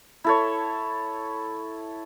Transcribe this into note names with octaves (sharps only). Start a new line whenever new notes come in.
E4 A4 C#5